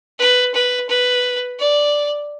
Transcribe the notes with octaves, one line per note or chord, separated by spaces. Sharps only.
B4
B4
B4
D5